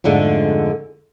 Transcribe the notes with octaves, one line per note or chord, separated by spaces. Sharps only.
F2 G#2 D3 G#3 A3